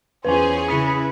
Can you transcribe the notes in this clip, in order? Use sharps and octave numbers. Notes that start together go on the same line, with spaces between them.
E2 C#4 F4 G#4 B4 C5 G#5
C#3 E4 B4 D#6 B6 C#7